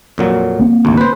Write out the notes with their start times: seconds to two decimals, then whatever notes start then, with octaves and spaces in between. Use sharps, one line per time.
0.18 F2 A#2 F#3
0.59 A#3 C4
0.85 G#1 D2
0.97 B4 C5